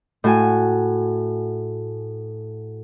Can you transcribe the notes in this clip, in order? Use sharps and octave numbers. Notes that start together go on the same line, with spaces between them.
A2 F#4 G#5